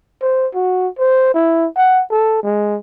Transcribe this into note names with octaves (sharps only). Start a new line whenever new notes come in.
C5
F#4
C5
E4
F#5
A4
G#3